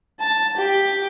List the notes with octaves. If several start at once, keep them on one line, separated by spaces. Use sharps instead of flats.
A5
G4